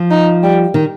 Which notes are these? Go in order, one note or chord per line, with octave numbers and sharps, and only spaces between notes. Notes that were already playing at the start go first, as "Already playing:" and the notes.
Already playing: F3
D#4
G3
D#3